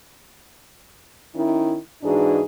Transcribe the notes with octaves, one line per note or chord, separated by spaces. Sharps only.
D#3 C#4 D#4 E4
G#2 E3 D4 D#4 F#4 G#4